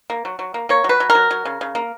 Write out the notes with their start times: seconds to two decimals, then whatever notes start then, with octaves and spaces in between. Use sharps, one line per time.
0.10 A#3
0.25 F#3
0.39 F#3
0.54 A#3
0.69 A#3 C#5
0.84 F#3 B4
1.00 F#3
1.10 A#4
1.15 F#3
1.31 F#3
1.45 C#3
1.61 C#3
1.75 A#3